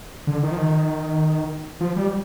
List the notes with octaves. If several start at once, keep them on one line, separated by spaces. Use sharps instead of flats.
D3
D#3
F3
D#3
F3
G3